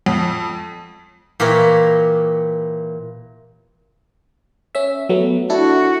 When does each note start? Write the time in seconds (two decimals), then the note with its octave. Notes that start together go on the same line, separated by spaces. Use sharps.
0.06 F2
1.40 A#2 E3 G4 A#4 C#5
4.75 C#4 E5
5.09 F#3 A3 B3
5.50 D4 E4 F#4 A4